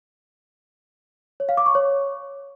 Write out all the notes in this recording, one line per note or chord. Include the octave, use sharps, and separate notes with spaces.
C#5
F5
D6
C#6
C#5